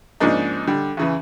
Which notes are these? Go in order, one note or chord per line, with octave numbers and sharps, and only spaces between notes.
G#2 C#3 F3 A#3 D4 D#4
D3 G3
E2 C#3 E3